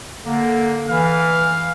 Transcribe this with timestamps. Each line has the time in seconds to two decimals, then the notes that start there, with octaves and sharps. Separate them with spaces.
0.24 D3 A#3
0.88 E3 F5